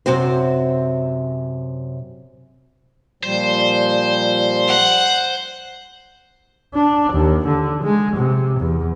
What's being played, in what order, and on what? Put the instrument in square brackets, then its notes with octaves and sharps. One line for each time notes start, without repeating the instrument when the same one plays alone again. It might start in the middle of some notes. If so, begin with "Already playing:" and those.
[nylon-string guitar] F#2 C3 C4 F#4 C5
[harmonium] A#2 F3 G3 [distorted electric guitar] C5
[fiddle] F#5
[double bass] D4
D#2
D3
G#3
C3
E2